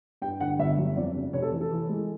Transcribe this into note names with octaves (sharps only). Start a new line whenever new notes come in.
G2 G5
D3 F#5
G1 E5
F#3
F2 D5
C#3
F1 C#5
A4
E3
A4
E3
G#3